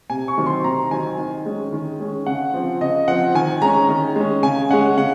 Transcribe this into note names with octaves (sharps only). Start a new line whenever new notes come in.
C3 G#5
C#6
D#3 F#3 C4
C6
C3 A#5
D#3 F#3 C4 G#5
D#3
G#3 C#4
D#3
G#3 C#4
C#3 F#5
F3 C4
C#3 D#5
F3 C4 F#5
D#3 G#5
G#3 C#4 A#5
D#3
G#3 C#4
C#3 G#5
G#3 C#4 F#5
C#3 F#5